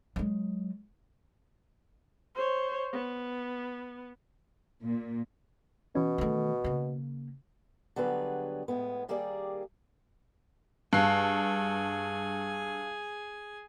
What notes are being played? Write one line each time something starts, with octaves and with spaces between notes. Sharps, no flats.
F#3 G#3
C5 C#5
B3
A#2
B2 E3 C#4
D#3 A3
C#3 A#3
D3 F#3 G3 B3 G#4 B4
A2 G#3 B3
D#3 G3 A#3 G4 G#4 D5
G2 G#4 F5 G#5 A5 F#6 C7